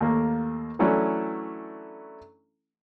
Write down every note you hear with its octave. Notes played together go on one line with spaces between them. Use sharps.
D#2 A3 A#3
E3 F#3 A3 C#4 D4 E4